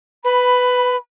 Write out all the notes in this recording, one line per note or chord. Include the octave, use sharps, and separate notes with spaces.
B4 B5